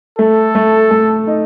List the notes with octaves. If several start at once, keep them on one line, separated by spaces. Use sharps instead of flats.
A3 A4
A3
A3
D#4